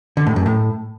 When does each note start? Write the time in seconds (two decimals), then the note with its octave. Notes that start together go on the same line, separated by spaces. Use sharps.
0.17 D3
0.27 A2
0.36 F#2
0.46 A2